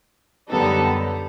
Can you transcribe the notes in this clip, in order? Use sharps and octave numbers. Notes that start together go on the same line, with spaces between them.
F#2 D3 G3 B3 D#4 A4